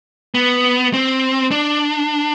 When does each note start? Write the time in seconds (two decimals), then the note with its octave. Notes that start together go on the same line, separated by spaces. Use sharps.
0.34 B3
0.94 C4
1.51 D4